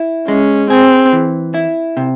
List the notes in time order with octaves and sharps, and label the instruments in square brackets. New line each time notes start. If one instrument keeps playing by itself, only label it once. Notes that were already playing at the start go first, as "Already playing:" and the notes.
Already playing: [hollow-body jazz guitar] E4
[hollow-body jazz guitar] G#3 [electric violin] C#4
[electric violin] C4 [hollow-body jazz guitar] G#4
[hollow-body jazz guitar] E3
E4
C3